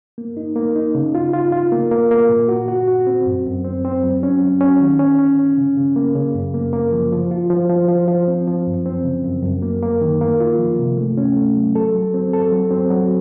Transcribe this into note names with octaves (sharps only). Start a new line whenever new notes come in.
A#3
D#4
A#3
D#4
C#3
F4
F4
F4
A#3
A#3
A#3
A#2
F#4
F#4
F#4
C4
F#2
F#2
C4
C4
F#3
C#4
F#3
C#4
D#3
C#4
C#4
C#4
C#3
C#3
A#3
C#3
F#2
A#3
A#3
F3
F3
F4
F3
F3
F3
F3
C4
F3
F#2
C4
C#3
F#2
F#2
A#3
A#3
D#3
A#3
F4
F3
C3
A3
C#4
A3
F#3
A4
F#3
C4
A4
F#3
C4
F#3